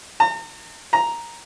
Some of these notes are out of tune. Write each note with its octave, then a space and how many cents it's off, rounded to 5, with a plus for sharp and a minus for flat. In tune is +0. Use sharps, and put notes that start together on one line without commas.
A#5 -45
A#5 +0